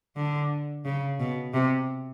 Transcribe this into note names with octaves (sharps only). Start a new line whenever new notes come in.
D3
C#3
B2
C3